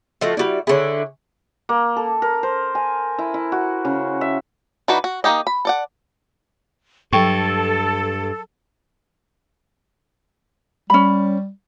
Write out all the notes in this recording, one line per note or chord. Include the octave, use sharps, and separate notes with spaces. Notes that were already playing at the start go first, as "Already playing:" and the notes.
F3 A3 F#4 D#5
G3 E4 F#4 D5 E5
D3 E4 G#4 C#5
A#3
A4
A#4
C5
G#5
E4
E4
F#4
C#3
E5
E3 D4 D#4 F#4 B4
F#4
A#3 C#4 D#4 G4 D#5
B5
A4 D5 F#5
G2 F#3 A4 G5 C#6
G3 C#4 B5